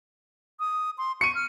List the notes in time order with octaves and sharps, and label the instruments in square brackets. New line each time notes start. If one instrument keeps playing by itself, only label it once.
[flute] D#6
C6
[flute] C#6 [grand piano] C#7 D#7
[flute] F6